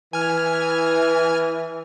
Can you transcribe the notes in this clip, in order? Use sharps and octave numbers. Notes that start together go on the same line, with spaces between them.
E3 G#5 F6